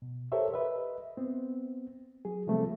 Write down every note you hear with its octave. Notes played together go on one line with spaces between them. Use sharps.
B2
G4 A4 A#4 C5 C#5 E5
B4 D#5 E5
B3 C4
F#3 G#4
C3 F3 G3 A3 A#3 C4